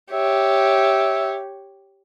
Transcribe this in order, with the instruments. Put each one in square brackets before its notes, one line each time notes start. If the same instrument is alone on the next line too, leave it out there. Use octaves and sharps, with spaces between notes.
[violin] G4 C#5 [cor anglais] E5